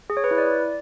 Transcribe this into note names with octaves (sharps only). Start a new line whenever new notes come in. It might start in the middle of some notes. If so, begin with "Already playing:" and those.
G#4
C#5
B4
E4
D5